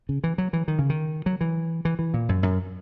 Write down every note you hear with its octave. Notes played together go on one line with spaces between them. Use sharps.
C#3
E3
F#3
E3
D#3
C#3
D#3
F#3
E3
E3
E3
A#2
F#2
F#2